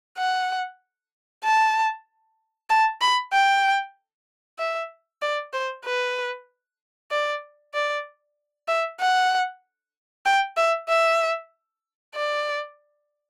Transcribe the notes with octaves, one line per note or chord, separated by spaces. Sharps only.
F#5
A5
A5
B5
G5
E5
D5
C5
B4
D5
D5
E5
F#5
G5
E5
E5
D5